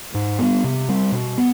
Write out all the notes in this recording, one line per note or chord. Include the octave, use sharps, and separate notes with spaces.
G#2
G3 B3
C3
G3 C4
B2
B3